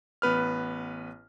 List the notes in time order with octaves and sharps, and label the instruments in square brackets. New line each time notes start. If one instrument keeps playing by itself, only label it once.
[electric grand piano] A1 B3 B4 F6